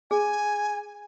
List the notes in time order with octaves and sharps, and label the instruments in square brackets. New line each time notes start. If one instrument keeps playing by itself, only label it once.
[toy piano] G#4 [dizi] G#5